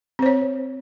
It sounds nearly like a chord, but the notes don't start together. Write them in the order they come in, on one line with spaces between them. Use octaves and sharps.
C4 C5 C#5